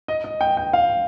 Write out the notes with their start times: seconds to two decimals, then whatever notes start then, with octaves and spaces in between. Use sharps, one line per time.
0.08 D#5
0.24 D#5
0.41 G5
0.57 G5
0.73 F5